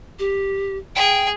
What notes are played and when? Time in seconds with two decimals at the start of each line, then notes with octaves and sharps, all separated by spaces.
0.19 G4
0.96 G#4 G5